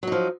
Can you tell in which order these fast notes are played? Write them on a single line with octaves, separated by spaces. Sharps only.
F#3 D#4 F3